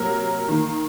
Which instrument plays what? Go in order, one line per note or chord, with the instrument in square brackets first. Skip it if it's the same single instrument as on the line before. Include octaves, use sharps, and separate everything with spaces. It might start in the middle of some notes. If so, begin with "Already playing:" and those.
Already playing: [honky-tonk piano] C3 F#3 A#3 A#4
D#3 A#3